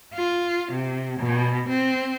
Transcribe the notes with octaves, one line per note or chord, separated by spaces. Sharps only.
F4
C3
B2
C4